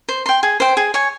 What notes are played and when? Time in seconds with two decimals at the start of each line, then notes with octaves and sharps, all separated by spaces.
0.09 C5
0.26 G5 C6
0.43 G#4
0.60 C5 G5
0.77 G#4
0.94 C#5 G#5